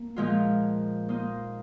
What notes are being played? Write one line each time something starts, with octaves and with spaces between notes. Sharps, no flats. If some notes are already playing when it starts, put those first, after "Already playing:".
Already playing: A#3
A#2 F3 G#3 F4
A#3 D#4 C5 D#5